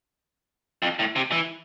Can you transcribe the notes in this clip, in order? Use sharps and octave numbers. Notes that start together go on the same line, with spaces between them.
F2
A2
C3
E3